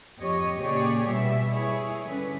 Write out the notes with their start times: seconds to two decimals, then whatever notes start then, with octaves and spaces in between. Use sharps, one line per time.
0.18 F2 G4 C#5 D#5
0.57 A#2 C#3 G4 G#4 C#5 D5
1.06 B2 G3 E5
1.51 E4 G#4 C#5
2.04 D3 G3 C#4 B4